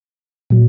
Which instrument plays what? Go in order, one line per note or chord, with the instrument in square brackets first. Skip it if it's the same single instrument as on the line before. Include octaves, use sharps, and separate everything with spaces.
[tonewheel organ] A#2 F#3